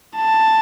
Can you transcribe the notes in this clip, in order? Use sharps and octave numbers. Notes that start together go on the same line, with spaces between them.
A5